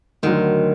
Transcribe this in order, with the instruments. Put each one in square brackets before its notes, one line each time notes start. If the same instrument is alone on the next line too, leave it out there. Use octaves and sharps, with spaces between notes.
[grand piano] D2 D3 F#3 [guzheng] D#3